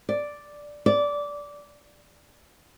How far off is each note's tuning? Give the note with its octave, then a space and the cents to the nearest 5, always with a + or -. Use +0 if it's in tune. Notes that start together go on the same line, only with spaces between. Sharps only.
D5 +0
D5 -15